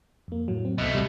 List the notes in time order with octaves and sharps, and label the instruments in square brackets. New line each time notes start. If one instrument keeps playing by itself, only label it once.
[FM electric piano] F2 A#3
A2 F#3
C4
[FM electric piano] C2 D#5 [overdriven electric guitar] B2 A3
[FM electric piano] A1 C3 G3